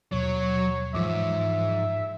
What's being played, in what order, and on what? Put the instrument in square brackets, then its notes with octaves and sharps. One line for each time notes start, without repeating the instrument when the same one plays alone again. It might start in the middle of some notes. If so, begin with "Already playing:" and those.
[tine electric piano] D#2 B2 [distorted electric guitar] F#3 [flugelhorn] C#5
[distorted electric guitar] G#2 [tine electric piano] E3 F3 D6 [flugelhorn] E5